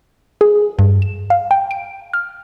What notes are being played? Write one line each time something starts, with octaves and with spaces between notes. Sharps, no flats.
G#4
G2
E7
F5
G5
D7
F6